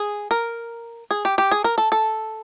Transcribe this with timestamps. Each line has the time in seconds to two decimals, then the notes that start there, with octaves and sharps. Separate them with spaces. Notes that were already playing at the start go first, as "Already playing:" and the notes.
Already playing: G#4
0.31 A#4
1.11 G#4
1.25 G4
1.38 G4
1.51 G#4
1.64 A#4
1.78 A4
1.92 A4